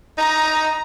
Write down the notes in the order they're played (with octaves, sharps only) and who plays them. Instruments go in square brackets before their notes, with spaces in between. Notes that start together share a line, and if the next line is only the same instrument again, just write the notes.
[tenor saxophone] D#4 [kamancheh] A#5